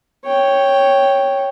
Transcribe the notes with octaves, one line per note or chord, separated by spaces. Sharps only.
C#5 G5